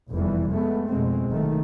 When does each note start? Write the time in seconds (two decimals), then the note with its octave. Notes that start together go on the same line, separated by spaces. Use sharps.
0.10 F1 E2 E3 G3
0.51 F2 G#3 A3 B3
0.88 F2 B2 G#3 C4
1.28 F#1 C3 D#3 A3